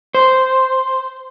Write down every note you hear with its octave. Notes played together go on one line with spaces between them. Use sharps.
C5